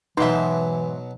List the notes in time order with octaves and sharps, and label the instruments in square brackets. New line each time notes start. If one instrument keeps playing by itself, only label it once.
[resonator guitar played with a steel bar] G#2 E5 [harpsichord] B2 F#3 [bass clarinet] E3 [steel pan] D#4 B4 C6